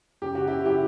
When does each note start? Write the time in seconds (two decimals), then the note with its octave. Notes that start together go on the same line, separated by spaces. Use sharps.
0.22 F#2 C#3 F#3 G4
0.35 F#4
0.47 E4 G4
0.66 C#3 F#3 E4 G4